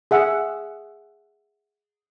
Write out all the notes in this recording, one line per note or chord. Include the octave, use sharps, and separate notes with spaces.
G#4 E5 F#5